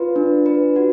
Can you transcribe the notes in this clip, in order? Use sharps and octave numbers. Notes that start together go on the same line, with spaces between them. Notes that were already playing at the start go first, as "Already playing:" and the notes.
Already playing: F4 B4
D4
B4
F#4